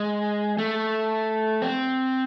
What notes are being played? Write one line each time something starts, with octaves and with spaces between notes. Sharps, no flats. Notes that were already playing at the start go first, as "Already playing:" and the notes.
Already playing: G#3
A3
C4